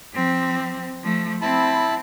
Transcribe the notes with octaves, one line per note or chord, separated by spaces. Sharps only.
F3 C4
F3 A3
C4 E4 A5 B5